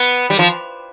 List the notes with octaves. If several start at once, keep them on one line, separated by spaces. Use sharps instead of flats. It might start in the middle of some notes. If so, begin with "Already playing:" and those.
Already playing: B3
G3
F3